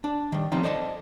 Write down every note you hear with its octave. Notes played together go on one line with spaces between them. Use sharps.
D4
D#3 G3
F3 G3 B3 C4 D#4
A4 C5 D5 D#5 F#5 A5